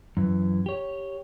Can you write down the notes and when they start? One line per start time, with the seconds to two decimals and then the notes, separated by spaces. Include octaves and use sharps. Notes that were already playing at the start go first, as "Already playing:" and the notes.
0.17 F#2 E3
0.66 G4 C#5